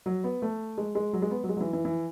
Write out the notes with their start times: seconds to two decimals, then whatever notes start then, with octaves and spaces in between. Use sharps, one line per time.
0.06 F#3
0.24 B3
0.42 A3
0.78 G#3
0.95 G#3
1.13 F#3
1.22 G#3
1.31 B3
1.44 F#3
1.49 G#3
1.57 F#3
1.61 E3
1.73 E3
1.85 E3